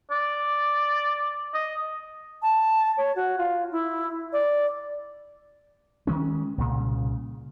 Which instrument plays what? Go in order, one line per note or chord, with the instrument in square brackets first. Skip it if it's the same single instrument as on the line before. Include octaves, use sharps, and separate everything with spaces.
[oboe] D5
D#5
[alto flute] A5
C#5
F#4
F4
E4
D5
[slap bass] D#3 E3 G#3 C#4
C2 A#2 C#3